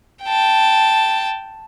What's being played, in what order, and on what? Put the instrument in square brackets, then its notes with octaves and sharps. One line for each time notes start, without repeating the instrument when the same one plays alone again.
[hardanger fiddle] G5 A5